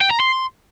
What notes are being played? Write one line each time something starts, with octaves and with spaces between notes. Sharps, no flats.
G5
A#5
C6